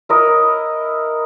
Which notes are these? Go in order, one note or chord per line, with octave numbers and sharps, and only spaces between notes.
E4 A#4 D#5